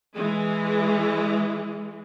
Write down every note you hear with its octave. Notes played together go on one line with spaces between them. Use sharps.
E3 G#3